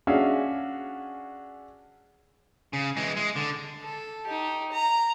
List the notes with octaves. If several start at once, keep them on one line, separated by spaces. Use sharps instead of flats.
C#4 D4 F#4 G#4 E5 F5
C#3
E3 G#3
G#3
D3
A4
D#4 G4
A#5